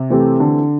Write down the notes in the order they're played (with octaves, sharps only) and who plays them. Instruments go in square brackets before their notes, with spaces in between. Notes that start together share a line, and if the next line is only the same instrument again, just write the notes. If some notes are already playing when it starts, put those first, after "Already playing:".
Already playing: [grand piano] C3
[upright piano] E3 A3 C4 G4
[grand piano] D3